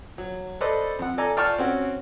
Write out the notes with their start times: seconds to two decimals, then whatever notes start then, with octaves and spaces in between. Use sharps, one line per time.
0.18 F#3
0.61 A4 B4 C5 D5 D#5
0.99 F2 F#5
1.18 A4 D5 G#5 A#5
1.37 F4 D5 G5 A5 C#6 F6
1.58 C4 C#4 F#4